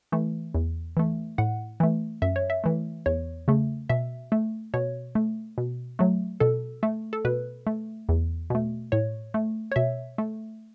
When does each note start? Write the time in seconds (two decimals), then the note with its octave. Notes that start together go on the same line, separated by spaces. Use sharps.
0.12 E3 A3
0.54 E2
0.97 E3 A3
1.38 A2 F#5
1.80 E3 A3
2.22 F#2 E5
2.36 C#5
2.50 E5
2.64 E3 A3
3.06 E2 C#5
3.48 C#3 A3
3.90 B2 E5
4.32 A3
4.74 B2 C#5
5.15 A3
5.58 B2
5.99 F#3 A3
6.40 B2 A4
6.83 A3
7.13 A4
7.25 B2 B4
7.67 A3
8.09 E2
8.50 B2 A3
8.92 A2 C#5
9.34 A3
9.72 C#5
9.76 B2 E5
10.18 A3